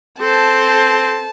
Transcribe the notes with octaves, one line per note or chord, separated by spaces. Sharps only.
C4 A4 C5 A5